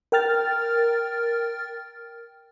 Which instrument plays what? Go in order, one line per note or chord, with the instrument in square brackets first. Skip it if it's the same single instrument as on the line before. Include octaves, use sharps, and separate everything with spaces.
[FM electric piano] A#4 G5 F6 A6